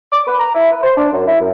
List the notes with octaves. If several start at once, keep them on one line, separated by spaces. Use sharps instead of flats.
D6
B4
A#5
E4
B4
C5
D4
F#2
E4
F#2